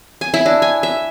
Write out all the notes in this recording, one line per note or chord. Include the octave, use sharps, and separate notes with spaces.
G#5
E4
D4
G#5
E5